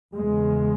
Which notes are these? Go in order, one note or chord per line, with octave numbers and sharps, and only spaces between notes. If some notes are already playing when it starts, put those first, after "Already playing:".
E2 C#3 G#3